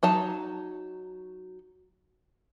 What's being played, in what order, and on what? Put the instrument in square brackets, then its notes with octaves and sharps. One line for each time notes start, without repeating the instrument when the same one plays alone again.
[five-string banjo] F#3 D#4 A5